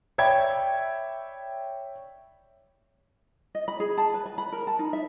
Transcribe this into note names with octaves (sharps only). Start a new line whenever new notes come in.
C#5 D5 E5 G5 B5 G#6
D#5
B5
G#4
A5
B4
A5
B5
A#4
A5
D#4
E5